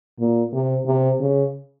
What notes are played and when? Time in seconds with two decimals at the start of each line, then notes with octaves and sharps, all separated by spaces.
0.20 A#2
0.53 C3
0.86 C3
1.20 C#3